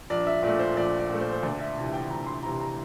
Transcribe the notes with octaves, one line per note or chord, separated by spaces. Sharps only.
A#1 D5
E5
A#2 A3 D5
C5
A#1 D5
D5
A#2 A3
C5
C5
D2 D5
E5
C3 E3
G5
D2 A#5
C6
C3 E3 A#5
A#5